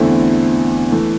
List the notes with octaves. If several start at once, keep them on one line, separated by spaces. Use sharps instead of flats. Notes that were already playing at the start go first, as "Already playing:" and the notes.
Already playing: E2 D3 A3 C4 E4
E3 A3